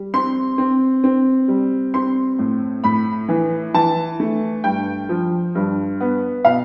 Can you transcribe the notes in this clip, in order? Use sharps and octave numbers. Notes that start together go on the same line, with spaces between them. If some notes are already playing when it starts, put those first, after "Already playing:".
Already playing: G3
C4 C6
C4
C4
G3
C4 C6
A2
A2 B5
E3
E3 A5
A3
G2 G5
F3
G2
B3
B2 F5